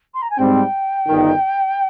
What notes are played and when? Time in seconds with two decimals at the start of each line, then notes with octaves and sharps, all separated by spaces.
0.14 C6
0.22 A#5
0.30 G#5
0.38 G#2 G3 C4 G5
1.08 G1 G2 D#3